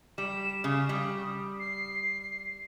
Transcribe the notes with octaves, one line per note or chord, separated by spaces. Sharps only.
G3 E7
C#3 D#6
G3
C7